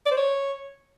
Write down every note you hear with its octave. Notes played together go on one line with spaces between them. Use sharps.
D5
C5
C#5